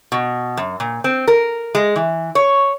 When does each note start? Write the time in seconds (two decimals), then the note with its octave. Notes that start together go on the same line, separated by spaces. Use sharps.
0.12 B2
0.57 F#2
0.80 A#2
1.04 C4
1.28 A#4
1.75 G#3
1.96 E3
2.35 C#5